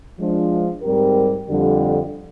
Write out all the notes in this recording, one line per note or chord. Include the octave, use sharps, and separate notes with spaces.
F3 G#3 D4
G#2 G3 C4 G4 A#4
F2 D3 G3